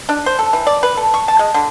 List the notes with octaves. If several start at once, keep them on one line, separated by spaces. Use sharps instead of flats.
D4
C5
A4
E3
D5
B4
A4
C#6
A5
G#3
D3